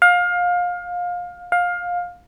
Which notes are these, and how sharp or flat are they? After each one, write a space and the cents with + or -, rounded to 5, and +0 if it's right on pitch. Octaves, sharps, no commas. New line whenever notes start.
F5 +25
F5 +20